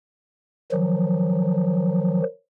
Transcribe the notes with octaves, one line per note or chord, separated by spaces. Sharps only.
D#3 F3 F#3